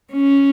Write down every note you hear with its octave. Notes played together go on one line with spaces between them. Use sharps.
C#4